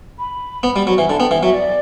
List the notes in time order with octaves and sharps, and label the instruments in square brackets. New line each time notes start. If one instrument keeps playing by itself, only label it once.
[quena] B5
[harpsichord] B3
G3
F#3
E3
[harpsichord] D3 [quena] A5
[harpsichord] B3 [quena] G5
[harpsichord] E3 [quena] F#5
[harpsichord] F#3 [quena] E5
[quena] D5